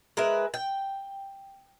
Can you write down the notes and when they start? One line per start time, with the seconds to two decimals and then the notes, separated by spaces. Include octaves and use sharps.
0.17 G#3 A#4 B4 E5
0.54 G5